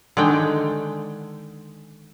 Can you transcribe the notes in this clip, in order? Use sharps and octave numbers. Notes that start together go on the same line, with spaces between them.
D3 D#3 G#3 D5 G5